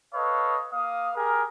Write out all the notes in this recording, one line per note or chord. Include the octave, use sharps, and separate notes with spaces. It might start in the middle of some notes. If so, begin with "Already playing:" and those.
A4 B4 C#5 D#5 F5
A#3 F5 D#6
G4 G#4 A#4